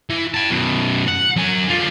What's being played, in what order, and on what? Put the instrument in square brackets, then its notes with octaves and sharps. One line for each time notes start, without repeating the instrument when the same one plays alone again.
[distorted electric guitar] E3
G5 A5
F#2 B2
F#5
F#3 G#5
D3 F4